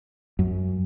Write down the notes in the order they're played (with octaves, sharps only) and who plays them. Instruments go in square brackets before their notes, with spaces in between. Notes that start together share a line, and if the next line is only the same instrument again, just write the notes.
[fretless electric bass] F#2